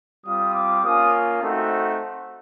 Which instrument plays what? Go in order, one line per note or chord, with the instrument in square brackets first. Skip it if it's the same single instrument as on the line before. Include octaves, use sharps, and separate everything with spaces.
[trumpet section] G3 C4 F4 D#6
D6
A#3 C#4 F4 D#6
A3 C4 D#4 F#4